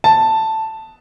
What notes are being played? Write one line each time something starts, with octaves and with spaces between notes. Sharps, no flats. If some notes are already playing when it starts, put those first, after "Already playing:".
A5